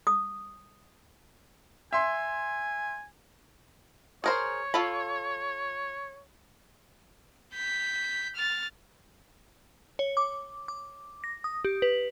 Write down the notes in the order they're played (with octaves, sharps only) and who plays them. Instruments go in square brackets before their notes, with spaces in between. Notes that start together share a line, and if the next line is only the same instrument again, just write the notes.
[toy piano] D#6
[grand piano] E5 C6 [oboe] G#5
[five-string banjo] G#4 A#4 C5 [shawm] C#5
[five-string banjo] F4 A4 B5
[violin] G6 B6
F6 A6
[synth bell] C#5
D6
D6
A#6
D#6
G4
B4